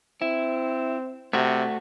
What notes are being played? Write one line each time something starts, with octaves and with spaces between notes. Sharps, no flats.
C4 E4
C3 A3 F#4